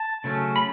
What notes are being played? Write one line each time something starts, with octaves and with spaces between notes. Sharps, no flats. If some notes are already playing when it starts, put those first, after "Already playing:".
Already playing: A5
C#3 F#3 A3 C#4
B5